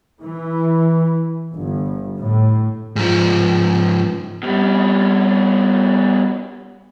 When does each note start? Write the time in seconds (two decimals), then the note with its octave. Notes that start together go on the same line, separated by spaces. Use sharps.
0.22 E3
1.53 G1
2.18 A2
2.96 G#2 F3
4.43 B2 G3